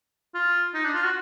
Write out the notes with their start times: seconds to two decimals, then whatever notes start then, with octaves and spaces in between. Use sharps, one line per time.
0.34 F4
0.74 D#4
0.84 D4
0.94 F4
1.04 F#4